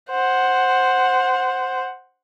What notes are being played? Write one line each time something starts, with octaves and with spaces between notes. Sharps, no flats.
C5 F#5